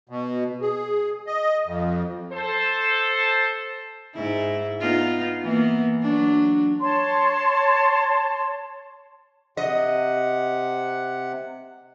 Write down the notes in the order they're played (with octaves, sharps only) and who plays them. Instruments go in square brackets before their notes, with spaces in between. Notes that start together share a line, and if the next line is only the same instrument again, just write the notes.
[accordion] B2
G#4
D#5
F2
[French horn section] A4 C5
[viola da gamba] G#2 E4
B3 D#4 F4
E3 A#3 B3
F#3 D4
[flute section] C#5 A5 C6
[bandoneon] C3 F#5 [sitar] D#5